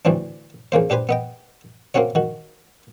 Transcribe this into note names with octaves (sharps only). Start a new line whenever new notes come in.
D2 A2 E3 C4 D4
A1 C#3 A#3 C5
D4 G4 B4 C5 G#5
B3 D#5 G5
A#3 C4 C#4 F#4 C#5
D#3 F#4